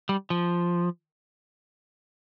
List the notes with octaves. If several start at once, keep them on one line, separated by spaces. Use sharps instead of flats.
G3
F3